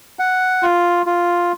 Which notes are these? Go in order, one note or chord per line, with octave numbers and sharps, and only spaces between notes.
F#5
F4
F4